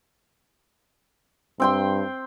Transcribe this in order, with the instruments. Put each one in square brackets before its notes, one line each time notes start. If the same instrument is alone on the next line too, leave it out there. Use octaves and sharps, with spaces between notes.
[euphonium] G2 [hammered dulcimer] C4 G5 C6